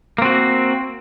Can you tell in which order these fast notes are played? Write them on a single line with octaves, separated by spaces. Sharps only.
A#3 C4 F#4